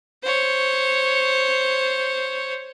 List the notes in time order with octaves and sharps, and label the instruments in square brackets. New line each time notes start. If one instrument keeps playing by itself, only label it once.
[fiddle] C5 C#5